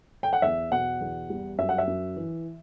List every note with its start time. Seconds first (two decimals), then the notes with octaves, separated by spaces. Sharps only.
0.23 G5
0.33 F#5
0.42 E2 E5
0.71 B2 F#5
1.01 E2
1.30 G3
1.58 F#2 E5
1.69 F#5
1.78 E5
1.87 F#2
2.16 E3